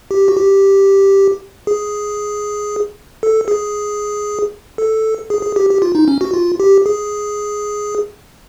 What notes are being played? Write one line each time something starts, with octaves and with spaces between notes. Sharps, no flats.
G4
F#4
G4
G#4
A4
G#4
A4
G#4
G#4
G4
G4
F4
D#4
C#4
F#4
F4
G4
G#4